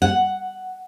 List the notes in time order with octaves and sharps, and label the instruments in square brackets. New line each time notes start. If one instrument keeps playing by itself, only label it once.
[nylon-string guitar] F#5